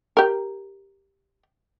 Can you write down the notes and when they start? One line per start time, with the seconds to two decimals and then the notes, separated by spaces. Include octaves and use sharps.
0.17 G4 A#4